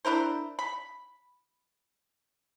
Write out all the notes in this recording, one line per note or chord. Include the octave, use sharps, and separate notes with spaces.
D4 E4 A#4 C5
B5